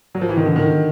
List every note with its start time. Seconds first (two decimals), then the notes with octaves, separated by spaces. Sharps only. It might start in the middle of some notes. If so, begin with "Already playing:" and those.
0.15 F#3
0.21 F3
0.29 E3
0.37 D#3
0.46 D3
0.56 D#3